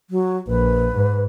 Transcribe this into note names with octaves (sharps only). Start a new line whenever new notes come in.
F#3
A#1 B4
G#2